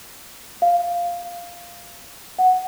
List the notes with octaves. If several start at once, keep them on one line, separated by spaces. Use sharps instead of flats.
F5
F#5